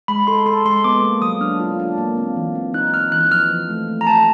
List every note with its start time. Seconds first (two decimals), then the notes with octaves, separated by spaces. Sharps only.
0.08 G#3 B5
0.27 A4 C6
0.46 A4 C6
0.65 G#3 C6
0.84 B3 D6
1.03 A#3
1.22 F#3 D#6
1.41 D4 F6
1.60 F4
1.79 D4
1.98 A#3
2.17 C4
2.36 E3
2.55 C4
2.74 D#4 F#6
2.94 D#4 F6
3.12 E3 F#6
3.31 F3 F6
3.50 F3
3.69 A3
3.88 A3
4.01 A#5
4.06 A3 A5